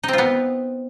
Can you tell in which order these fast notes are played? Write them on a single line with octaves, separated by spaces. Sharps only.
D#4 C4 F4 B3